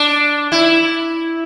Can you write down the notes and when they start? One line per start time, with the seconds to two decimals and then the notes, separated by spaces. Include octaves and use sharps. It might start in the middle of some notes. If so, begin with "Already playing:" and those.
Already playing: D4
0.52 E4